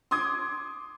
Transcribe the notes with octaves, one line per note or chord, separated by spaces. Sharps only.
C6 D6 D#6 G#6